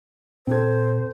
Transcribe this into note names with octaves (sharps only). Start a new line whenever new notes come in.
A#2 C4 A4 C5 G#6